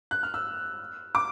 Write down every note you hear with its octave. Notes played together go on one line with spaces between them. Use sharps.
F#6
F6
E6
D6